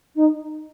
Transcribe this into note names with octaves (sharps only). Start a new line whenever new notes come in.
D#4